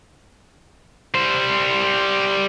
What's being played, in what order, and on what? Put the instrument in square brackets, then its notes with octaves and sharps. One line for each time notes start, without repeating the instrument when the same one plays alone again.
[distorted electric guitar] G3 C5